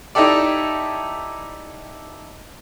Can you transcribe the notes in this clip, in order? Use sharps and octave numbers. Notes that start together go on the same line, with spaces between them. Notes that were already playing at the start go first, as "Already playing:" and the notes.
D#4 E4 G4 A4 D5